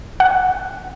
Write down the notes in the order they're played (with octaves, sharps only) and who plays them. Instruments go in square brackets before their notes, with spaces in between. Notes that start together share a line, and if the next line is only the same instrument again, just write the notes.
[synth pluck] F#5